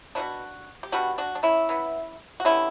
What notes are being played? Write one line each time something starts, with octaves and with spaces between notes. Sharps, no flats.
B2 G3 B3 D4 F#4
G4
B2 G3 B3 D4 F#4
D4 F#4
D4
C#4 E4
E3 B3
F#4
D3 G3 B3 C#4 E4